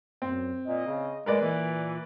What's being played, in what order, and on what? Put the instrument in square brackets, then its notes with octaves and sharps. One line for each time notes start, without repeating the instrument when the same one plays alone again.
[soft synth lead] F#2 [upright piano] C4
[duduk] A#2 [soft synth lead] D#5
[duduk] C#3
[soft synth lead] A2 [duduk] G#3 [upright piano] A#4 B4 D5
[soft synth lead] A#2 [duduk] E3